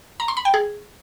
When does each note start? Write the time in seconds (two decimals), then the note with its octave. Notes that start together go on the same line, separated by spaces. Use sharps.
0.20 A#5
0.28 C6
0.37 B5
0.45 G5
0.54 G#4